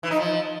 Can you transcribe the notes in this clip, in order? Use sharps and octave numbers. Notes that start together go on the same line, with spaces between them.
E3
D#4
F3